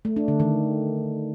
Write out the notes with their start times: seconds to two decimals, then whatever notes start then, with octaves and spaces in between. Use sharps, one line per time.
0.05 A3
0.16 D4
0.28 D3
0.40 D#3